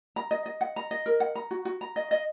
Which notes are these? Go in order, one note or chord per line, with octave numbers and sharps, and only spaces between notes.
A#5
D#5
D#5
F#5
A#5
D#5
A#4
F#5
A#5
F#4
F#4
A#5
D#5
D#5